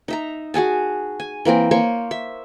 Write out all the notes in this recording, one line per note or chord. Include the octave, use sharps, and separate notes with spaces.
D#4 E5 A#5
F#4 G#4 G#5 A5
G#5
E3 A#3 C4 A#4
A#3 C5 C#5 C#6
E5